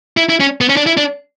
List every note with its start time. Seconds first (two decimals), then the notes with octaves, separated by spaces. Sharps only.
0.17 E4
0.29 E4
0.40 C#4
0.61 B3
0.69 C#4
0.77 D4
0.86 E4
0.97 D4